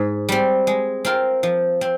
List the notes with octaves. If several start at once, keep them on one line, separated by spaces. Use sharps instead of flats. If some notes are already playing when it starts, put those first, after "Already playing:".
Already playing: G#2
G3 C4
G#3
C4 F4 A#4
F3
C4